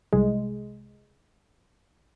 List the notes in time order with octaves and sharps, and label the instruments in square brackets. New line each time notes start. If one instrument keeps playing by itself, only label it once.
[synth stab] C2 G#3